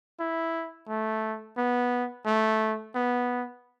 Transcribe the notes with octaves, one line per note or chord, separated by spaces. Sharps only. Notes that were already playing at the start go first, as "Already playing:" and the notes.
E4
A3
B3
A3
B3